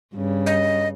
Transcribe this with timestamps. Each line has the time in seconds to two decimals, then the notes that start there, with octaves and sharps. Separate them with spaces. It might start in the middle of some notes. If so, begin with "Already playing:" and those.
0.15 G2 C#3
0.46 D#5